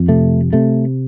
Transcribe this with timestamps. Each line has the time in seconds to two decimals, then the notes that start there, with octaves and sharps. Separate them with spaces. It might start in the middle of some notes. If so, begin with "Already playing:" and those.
Already playing: F2
0.09 C3 A3
0.53 C3 A3